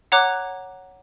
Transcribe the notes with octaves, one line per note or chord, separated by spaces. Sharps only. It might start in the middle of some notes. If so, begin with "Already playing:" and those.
C#5 F#5 A#5 D6 F#6